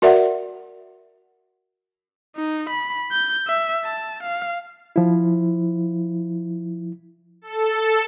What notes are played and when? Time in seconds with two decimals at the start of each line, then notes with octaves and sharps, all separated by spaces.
0.02 F#4 A#4 D5 E5 F#5
2.37 D#4
2.70 B5
3.12 G6
3.48 E5
3.85 A5
4.23 F5
4.96 F3 E4
7.42 A4